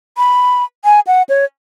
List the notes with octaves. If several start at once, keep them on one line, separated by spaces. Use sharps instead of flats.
B5
G#5
F#5
C#5